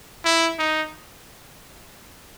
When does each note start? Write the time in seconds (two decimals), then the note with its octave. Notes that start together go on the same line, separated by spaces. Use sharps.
0.25 E4
0.59 D#4